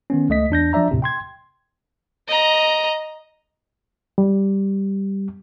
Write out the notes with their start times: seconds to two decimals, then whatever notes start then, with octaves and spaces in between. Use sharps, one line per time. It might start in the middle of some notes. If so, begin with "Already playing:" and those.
0.10 D#3 B3 C#4
0.29 C#2 A3 D#5 B6
0.50 E2 D4 G6 A#6
0.73 F3 D4 D5 E5 A#5
0.91 D#2 A2 C3
1.02 G5 C6 G#6
2.28 D#5 A#5
4.18 G3